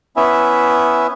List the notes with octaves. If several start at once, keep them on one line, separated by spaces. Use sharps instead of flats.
B3 C#4 E4 E5